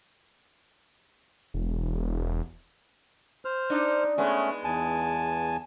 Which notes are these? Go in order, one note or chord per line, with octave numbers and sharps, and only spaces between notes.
E1
C5 F6
D4 D#4
G#3 A3 B3 C#4
E2 G#5 A5